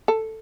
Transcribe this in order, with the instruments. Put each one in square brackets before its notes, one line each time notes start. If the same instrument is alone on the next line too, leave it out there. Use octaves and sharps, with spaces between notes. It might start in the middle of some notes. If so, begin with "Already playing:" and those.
[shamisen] A4